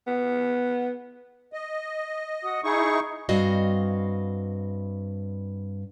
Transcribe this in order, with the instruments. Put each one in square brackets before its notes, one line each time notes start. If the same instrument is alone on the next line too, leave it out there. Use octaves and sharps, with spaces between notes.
[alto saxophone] B3
[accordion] D#5
[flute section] F#4 F#5 D#6
[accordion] D#4 E4 C#6 [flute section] G#4 D#6
[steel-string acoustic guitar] G2 C4 F#4 D#5 F5